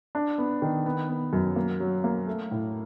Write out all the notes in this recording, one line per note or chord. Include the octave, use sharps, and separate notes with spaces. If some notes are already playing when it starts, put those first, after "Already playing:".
D4
B3
D#3
B3
B3
F#2
A#3
F#3
A#3
A3
A2